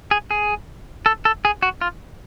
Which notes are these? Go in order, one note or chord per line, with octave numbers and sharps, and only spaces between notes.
G#4
G#4
A4
A4
G#4
F#4
F4